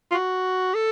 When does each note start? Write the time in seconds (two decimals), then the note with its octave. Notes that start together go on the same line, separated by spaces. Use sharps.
0.11 F4
0.15 F#4
0.74 A4